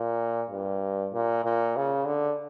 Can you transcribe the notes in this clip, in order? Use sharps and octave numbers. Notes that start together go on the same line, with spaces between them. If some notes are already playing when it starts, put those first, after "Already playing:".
Already playing: A#2
G2
A#2
A#2
C#3
D3